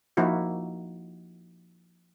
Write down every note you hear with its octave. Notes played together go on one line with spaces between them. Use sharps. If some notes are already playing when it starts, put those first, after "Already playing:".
F3 A#3 D#4 E4 F#4